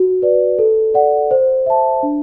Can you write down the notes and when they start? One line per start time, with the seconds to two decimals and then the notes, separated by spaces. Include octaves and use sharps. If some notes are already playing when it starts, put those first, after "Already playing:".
Already playing: F#4
0.22 B4 D5
0.59 A4
0.94 D5 F#5
1.31 C5
1.66 E5 A5
2.03 D4